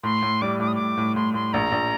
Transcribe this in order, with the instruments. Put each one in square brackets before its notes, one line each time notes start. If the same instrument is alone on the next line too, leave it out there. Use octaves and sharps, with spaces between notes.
[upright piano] A2 [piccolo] C6
[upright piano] A2
[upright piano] G3 [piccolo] D6
[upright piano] A2 [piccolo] D6
[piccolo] D#6
[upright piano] A2 [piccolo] D6
[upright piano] A2
[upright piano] A2 [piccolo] C6
[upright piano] A2 [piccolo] C6
[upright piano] A#1 [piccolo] A#5
[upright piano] A#1